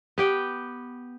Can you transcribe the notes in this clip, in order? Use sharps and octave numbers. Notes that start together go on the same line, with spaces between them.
B3 G4 G5